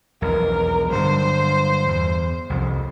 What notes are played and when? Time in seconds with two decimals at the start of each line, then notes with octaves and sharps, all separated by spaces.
0.22 E1 B1 F2 A#4
0.90 G2 D3 F#3 C5
1.88 E2
2.50 C2 F2 F3